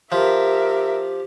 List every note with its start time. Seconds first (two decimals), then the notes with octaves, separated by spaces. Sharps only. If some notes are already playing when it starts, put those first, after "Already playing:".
0.12 F3 G4 A#4 E5